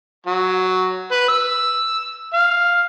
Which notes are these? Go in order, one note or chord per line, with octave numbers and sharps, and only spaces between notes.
F#3
B4
E6
F5